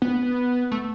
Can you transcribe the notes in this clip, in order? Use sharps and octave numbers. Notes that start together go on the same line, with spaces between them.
B3
A3